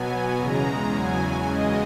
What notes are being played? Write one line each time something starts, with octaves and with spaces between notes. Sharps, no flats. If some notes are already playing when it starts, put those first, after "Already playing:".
Already playing: B2 F#3 B3 G#5
E2 C#3 G#3 A#5
E2 C#3 F#3 G#5
E2 C#3 G#3 D#5